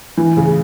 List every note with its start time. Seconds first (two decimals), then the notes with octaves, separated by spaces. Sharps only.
0.17 E3
0.37 C#3